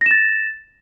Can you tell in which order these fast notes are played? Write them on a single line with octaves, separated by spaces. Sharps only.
A#6 E7 A6